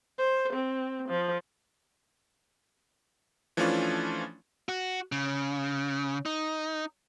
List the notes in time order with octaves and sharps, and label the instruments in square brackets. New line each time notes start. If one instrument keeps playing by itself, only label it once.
[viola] C5
C4
F3
[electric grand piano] E3 F3 A3 C#4 D4 F4
[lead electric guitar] F#4
C#3
D#4